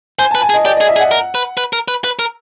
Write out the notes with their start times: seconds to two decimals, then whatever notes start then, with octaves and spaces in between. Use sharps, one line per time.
0.19 C5 G#5
0.31 B4 A5
0.42 G#5
0.50 G#4
0.54 D#5
0.65 G4 D5
0.77 G#4 D#5
0.88 E5
0.96 G#4
1.00 F#5
1.11 A#4
1.35 B4
1.57 B4
1.73 A#4
1.88 B4
2.04 B4
2.19 A#4